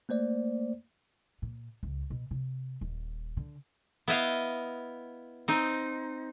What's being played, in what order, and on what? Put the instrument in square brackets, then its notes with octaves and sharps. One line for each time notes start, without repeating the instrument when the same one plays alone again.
[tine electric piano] A3 A#3 C5 D5
[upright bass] A#2
C#2
B2
C3
D#1
D3
[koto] B3 E4 D#5 F5
C4 D#4